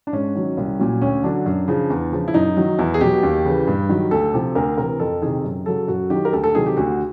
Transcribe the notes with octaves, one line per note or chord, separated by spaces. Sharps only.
D4
G#2 C#4
D#3 F#3
C2
A#2 F#3
D2 C#4
D3 F#3 D4
F#2
C#3 F3
E2
C#3 F3
E4
F#2 D#4
D#3 F#3
E2 E4
G#4
B2 F#3 G4
D#2
C#3 E3
G2
D#3 F#3
D2 A4
C3 F3
D2 A#4
C3 E3 A#4
F2 A4
C3 D#3 G#4
F#2
C#3 F#3 A4
F#2 F#4
D#3 F#3 G4
A#4
D2 A4
A4
C3 D#3 F#3 G#4
G4
D2 F#4